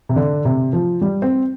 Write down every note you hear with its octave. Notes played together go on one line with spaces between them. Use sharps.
C3
D3
C3
F3
G3
C4